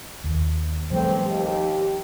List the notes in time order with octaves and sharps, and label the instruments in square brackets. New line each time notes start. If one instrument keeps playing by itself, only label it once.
[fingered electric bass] D#2
[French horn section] E2 A2 C4 [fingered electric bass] F3 G3 A3
[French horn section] D#2 G4